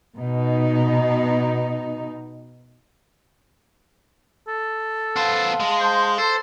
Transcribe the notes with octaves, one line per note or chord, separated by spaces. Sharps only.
B2 D#4
A4
B3 C5 F5 A5 C6
G#3
C5
A4 C5